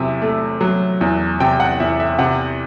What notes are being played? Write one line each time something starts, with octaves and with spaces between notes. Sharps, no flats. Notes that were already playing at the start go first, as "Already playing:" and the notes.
Already playing: E2 C3 F#3 E5
A3
F#3
E2
C3 G5
F#5
E2 E5
E5
C3 F#5